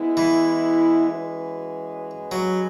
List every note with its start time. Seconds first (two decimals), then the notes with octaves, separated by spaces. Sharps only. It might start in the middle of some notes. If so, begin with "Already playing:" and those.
Already playing: G#3 B3 E4
0.17 E3
1.09 G#3 C#4 F#4 B4
2.32 F#3